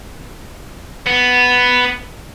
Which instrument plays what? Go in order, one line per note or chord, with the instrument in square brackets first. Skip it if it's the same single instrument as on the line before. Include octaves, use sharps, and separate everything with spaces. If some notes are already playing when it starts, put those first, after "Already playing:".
[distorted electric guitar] B3